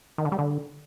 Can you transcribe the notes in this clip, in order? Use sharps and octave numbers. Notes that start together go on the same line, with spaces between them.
D#3
D3
G3
D3